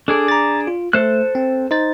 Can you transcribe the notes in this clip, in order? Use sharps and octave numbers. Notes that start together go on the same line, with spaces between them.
D4 G#4 A4 D5
A#5 A6
F4
A3 A4 C5 F#6
C4
D#4 C5 A6